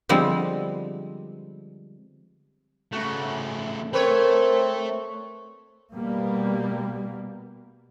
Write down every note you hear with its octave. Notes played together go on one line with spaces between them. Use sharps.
D3 F3 G3 G#3 B3 C4
C#3 A3 F#4
A3 C4 A#4 B4 C#5
B2 G3 A#3 B3